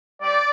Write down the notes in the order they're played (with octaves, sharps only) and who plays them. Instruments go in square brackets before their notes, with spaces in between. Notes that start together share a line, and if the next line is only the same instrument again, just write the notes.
[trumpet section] G3 C4 D5